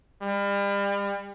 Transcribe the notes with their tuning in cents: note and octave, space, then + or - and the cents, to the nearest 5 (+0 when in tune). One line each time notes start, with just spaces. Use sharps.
G3 +40